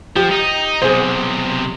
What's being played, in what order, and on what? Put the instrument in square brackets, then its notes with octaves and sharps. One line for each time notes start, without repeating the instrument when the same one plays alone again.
[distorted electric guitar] F3 [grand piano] G4
[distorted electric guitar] D#4
[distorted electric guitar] B1 C3 [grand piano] G#4 C5